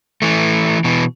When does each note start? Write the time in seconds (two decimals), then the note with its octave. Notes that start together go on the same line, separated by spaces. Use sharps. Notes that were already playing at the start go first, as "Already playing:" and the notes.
0.22 E3 A3
0.84 B2 E3